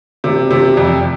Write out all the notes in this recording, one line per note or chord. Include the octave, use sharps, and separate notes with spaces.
C3
C3
F2